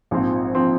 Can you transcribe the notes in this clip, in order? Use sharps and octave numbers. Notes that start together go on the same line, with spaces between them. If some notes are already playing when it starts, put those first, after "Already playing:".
A#1 G#2 F3 C4
F3 C4